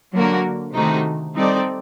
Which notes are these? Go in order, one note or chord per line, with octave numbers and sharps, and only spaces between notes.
D3 F#3 A#3 F#4 A#4
C3 D#3 A3 D#4 F#4
G3 C4 D#4 A4 D5